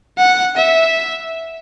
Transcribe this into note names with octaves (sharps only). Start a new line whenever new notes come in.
F#5
E5